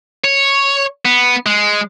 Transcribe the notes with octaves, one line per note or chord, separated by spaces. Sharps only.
C#5
B3
G#3